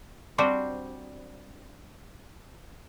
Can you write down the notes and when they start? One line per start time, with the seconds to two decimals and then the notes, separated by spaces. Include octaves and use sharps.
0.38 G3 C4 D4 F#4 C5